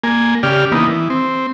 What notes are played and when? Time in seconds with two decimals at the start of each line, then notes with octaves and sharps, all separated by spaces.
0.04 A#3 G#5
0.43 C#3 G4 D5 F6
0.72 E3 A#3 B3 D#4
0.88 E3
1.10 C4